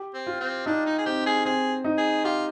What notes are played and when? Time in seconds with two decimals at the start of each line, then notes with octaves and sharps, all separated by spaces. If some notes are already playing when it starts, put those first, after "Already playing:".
Already playing: G4
0.14 C4
0.27 F4
0.40 C4
0.66 D4 D#4
0.86 D#4
0.98 G#4
1.06 C4 G4
1.26 G#4
1.45 C4 G#4
1.84 D#4
1.98 G#4
2.24 F4 G4